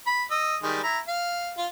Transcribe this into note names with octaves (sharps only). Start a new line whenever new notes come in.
B5
D#5 E6
D#3 G3 G#3
E4 A#5
F5
F4